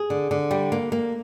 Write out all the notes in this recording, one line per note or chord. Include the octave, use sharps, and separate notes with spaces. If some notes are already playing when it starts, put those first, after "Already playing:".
Already playing: G#4
D3
D3
G3
A#3
A#3